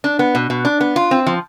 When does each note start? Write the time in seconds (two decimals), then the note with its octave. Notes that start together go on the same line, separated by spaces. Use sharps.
0.04 D4
0.19 B3
0.35 B2
0.50 B2
0.65 D4
0.81 B3
0.96 F4
1.11 C4
1.27 F3